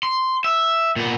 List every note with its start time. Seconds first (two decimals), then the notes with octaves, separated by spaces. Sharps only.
0.03 C6
0.44 E5
0.96 A#2 B3